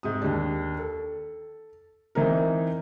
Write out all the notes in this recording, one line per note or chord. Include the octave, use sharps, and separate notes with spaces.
G#2 C3 D#6
D#2 D4
A4
E3 C4 D#4 A#4